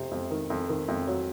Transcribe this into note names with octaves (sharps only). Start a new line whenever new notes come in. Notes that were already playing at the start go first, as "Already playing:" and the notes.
Already playing: F2 C3 C5
F2
D#3
F2
D#3
F2
F#3